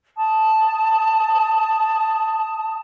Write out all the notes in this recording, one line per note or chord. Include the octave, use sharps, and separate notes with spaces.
A5 D#6